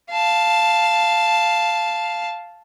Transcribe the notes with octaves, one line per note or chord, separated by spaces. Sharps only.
F5 A5